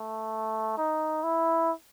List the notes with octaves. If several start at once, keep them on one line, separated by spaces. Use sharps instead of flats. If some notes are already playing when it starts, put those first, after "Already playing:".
Already playing: A3
D#4
E4